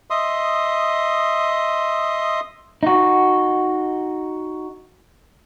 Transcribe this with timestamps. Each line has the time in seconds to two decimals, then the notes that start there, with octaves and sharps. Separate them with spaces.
0.10 D#5 E5 C6 D#6
2.83 D#4 F#4